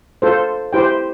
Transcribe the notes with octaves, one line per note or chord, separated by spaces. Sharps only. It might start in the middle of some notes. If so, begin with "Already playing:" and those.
F4 A4 C5
E4 G4 C5 G5